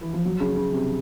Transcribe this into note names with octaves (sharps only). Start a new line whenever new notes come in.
E3
F3
F#3
C#3
C#3
C3